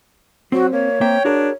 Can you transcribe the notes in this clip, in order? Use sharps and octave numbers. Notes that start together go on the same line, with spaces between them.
F#3 C4 F#4
A#3 C#5
A#3 C4 E5 G5
D4 F#4 G#4 A#4